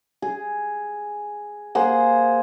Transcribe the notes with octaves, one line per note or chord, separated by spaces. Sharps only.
G#4
A#3 G#4 C5 F#5